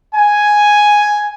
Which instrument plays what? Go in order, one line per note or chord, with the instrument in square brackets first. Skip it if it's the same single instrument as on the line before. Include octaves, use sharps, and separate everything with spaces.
[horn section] G#5